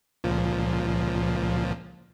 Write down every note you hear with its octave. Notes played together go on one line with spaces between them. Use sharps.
C#2 A#2 F3